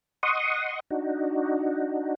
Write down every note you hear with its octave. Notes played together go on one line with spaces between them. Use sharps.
D#5 F#5 C6 C#6 D#6
D4 D#4 F#4